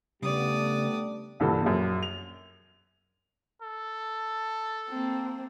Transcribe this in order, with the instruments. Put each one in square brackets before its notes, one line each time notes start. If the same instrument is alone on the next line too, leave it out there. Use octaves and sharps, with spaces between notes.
[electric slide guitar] C#3 G3 [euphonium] A3 [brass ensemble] B3 D4 G4 [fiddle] D5 D#6
[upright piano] C2 G2 A#2 E3 A4
A#1 F#2
F7
[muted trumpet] A4
[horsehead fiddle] A#3 C4